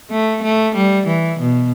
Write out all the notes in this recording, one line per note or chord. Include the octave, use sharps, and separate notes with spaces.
A3
A3
G3
E3
B2